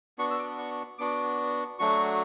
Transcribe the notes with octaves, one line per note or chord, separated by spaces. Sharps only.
B3 D4 F#4 C#6
E6
D6
C#6
B3 D4 F#4 D6
F#3 A3 D4 F#4 C#6